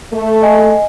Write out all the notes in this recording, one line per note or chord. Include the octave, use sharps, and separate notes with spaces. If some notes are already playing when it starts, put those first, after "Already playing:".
A3
D#5 G#5